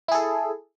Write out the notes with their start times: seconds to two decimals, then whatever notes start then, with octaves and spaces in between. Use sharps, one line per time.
0.08 E4
0.12 G#4
0.15 A4